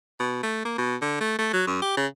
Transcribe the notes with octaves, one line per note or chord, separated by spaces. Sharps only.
B2
A3
A#3
B2
D3
A3
A3
F#3
F#2
G4
C#3